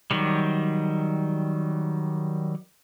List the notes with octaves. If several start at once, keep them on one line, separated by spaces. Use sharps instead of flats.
D#3 F#3 G3